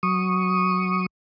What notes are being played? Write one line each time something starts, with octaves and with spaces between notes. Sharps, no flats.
F#3 C#6 D#6